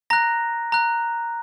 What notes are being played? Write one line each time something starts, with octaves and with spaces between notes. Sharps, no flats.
A#5 F#6 A#6
A#5 F#6